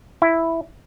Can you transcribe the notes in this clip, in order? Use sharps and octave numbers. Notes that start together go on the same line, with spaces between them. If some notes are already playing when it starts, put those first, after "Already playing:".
E4